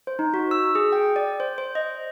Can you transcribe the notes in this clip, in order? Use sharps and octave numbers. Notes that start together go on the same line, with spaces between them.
C5
D#4
F#4
E6
G#4
G5
D5
C5
C5
D#5